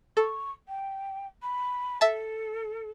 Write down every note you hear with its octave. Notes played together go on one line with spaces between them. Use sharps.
A4 C#6
G5
B5
A4 E5 A5